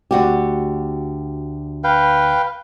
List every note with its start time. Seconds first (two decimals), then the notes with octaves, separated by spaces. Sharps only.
0.11 D2 F#4 G4
1.84 B4 F5 G5